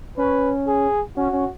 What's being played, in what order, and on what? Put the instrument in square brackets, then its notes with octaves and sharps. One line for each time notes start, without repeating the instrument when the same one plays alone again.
[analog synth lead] C#4 [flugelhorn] B4
[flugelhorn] G#4
[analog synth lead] C#4 [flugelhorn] F#4
[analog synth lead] C#4